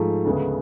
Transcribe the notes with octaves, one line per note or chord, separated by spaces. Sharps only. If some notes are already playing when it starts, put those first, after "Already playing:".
Already playing: G#2 F3 A3
D2 C#3 G#3 B3